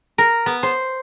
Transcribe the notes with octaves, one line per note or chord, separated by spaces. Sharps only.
A#4
B3
C5